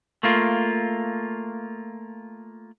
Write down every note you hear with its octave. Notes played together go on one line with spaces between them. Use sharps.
A3 A#3 F4